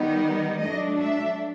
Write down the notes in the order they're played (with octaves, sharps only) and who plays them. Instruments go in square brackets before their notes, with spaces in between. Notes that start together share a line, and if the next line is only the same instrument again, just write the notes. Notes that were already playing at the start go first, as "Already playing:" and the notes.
Already playing: [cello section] D#3 G3 B3 D#4
F#3 A3 D4 D#5
E5